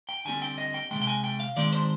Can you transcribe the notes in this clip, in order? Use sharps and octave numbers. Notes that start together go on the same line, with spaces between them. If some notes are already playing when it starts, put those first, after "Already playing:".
G5
D3 G3 C4 G#5
G5
D#5
G5
C3 F3 G#3 G5
G5
G#5
G5
F5
D#3 G#3 C4 D5
C5